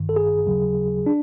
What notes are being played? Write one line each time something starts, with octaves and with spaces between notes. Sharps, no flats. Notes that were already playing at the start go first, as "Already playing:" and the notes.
Already playing: A1 G2 D#3
A4
G#4
D#2 C#3 F#3
D4